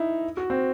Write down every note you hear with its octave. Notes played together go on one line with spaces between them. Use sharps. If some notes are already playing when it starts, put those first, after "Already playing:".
Already playing: D#4 E4
F#4
C4